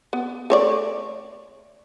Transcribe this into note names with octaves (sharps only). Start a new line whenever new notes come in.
B3
A3 C#5 D5